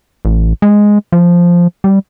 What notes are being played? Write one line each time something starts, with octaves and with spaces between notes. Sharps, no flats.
A1
G#3
F3
G3